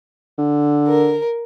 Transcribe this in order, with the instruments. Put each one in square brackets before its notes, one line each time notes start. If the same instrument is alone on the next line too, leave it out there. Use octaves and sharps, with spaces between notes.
[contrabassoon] D3
[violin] A#4